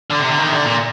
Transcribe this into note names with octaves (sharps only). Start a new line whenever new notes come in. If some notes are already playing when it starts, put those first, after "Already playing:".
D3
C3
D3
D#3
C3
D3
A#2